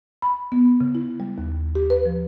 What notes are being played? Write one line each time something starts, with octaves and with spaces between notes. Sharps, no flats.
B5
B3
C#3
E4
G3
D#2
G4
B4
F3